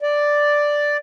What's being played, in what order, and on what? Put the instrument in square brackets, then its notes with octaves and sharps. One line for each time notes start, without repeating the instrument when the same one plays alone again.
[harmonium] D5